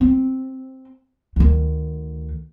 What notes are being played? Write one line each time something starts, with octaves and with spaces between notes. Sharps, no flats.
C4
D2 D#3